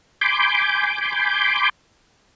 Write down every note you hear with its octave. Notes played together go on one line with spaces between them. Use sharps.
G#5 B5 C6 D6 G6